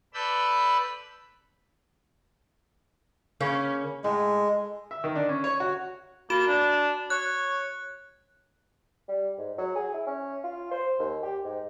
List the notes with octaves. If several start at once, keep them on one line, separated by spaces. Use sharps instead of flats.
A4 B4 D5 B5 E6 G6
C#3 A#3 C#4
A2 G#3
E5
D#3
D4
C#4
C#5
F#4
A#3 F#4 E7
D4
C#5 F#6
G3
G#2
F#3
G#4
E4
C#4
F4
C5
D#2
G4
G#2